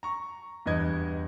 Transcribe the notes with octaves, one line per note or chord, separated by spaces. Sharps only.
A#5 C#6
E2 G2 B4 D#5 G#6